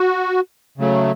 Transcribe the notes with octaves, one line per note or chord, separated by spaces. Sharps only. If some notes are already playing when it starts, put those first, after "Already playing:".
Already playing: F#4
C#3 F#3 A3